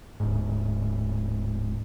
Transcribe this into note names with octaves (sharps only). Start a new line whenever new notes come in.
D1 G#2